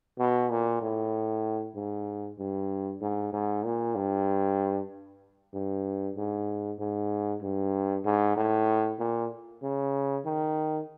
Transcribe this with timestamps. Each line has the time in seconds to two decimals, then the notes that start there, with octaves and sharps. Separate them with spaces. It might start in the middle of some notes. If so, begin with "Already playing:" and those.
0.19 B2
0.50 A#2
0.82 A2
1.76 G#2
2.39 G2
3.01 G#2
3.33 G#2
3.64 A#2
3.96 G2
5.54 G2
6.16 G#2
6.79 G#2
7.42 G2
8.05 G#2
8.37 A2
8.99 A#2
9.63 C#3
10.25 D#3